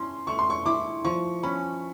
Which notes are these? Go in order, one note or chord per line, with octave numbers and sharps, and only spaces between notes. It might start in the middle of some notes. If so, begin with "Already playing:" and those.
Already playing: C#4 E4 C6
A3 C#6
C6
C#6
E4 D6
F3 C#6
C#4 B5